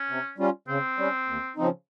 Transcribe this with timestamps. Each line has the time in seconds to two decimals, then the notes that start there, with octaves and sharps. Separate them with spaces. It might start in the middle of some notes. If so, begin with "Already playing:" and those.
Already playing: C#4
0.09 C3
0.38 G3 C#4 F4
0.68 C#3 C4
0.98 G3 C#4
1.27 D#2
1.56 C#3 F3 C4 D#4